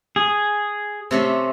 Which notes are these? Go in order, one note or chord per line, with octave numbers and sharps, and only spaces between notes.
G#4
C3 A3 C#4